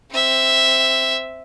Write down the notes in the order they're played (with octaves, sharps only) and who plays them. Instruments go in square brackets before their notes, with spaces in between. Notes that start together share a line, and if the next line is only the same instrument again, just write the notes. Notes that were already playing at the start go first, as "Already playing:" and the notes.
[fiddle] C4 E5